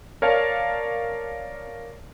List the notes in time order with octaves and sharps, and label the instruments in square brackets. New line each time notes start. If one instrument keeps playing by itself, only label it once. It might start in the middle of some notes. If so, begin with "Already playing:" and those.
[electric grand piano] A#4 C#5 D5 F5 A5